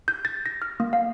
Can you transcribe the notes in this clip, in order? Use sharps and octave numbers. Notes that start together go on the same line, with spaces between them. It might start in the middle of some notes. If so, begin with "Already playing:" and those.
G6
A6
A#6
F6
A#3
F5